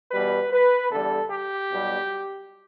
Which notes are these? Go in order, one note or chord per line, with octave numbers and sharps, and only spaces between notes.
E2 B2 G3 B4
B4
E2 D3 G3 A4
G4
B1 B2 G3